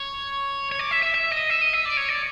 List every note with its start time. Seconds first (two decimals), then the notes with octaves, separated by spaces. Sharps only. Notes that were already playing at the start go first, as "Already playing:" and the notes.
Already playing: C#5
0.72 C#5
0.79 D5
0.91 E5
1.02 E5
1.14 E5
1.32 D#5
1.50 E5
1.61 D#5
1.73 E5
1.85 D5
1.97 C#5
2.09 D5